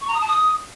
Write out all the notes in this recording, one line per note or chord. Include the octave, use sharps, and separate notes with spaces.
C#6
A#5
D#6
A5
D#6